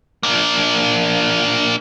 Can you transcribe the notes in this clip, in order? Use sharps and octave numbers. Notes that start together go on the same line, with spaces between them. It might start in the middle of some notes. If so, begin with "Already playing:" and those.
A#3 D4